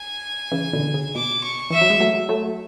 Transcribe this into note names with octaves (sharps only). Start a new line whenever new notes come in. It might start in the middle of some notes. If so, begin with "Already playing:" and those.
Already playing: G#5
C#3 E3
B2 D3
C#3
B2 D6
C#6
E3 E5
F#3
G#3
F#3 A3
F#3 A3